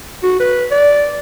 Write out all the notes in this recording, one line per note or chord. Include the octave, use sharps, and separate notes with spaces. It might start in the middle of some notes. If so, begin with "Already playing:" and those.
F#4
B4
D5